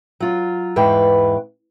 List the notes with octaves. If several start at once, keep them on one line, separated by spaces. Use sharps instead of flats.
F#3 F4
E2 G#2 B4 G5